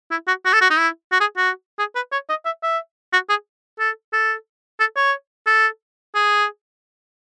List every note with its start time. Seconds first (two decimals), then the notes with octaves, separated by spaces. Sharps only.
0.11 E4
0.27 F#4
0.45 F#4
0.53 A4
0.61 F#4
0.70 D#4
0.78 E4
1.11 F#4
1.20 G#4
1.37 F#4
1.78 G#4
1.95 B4
2.12 C#5
2.29 D#5
2.45 E5
2.63 E5
3.12 F#4
3.29 G#4
3.79 A4
4.13 A4
4.79 A4
4.96 C#5
5.46 A4
6.15 G#4